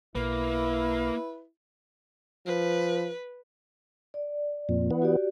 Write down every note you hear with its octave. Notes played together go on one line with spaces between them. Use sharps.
B1 A#3 E4 B4
F3 B4
D5
F2 A#2
E3 B3
F#4 G4 D5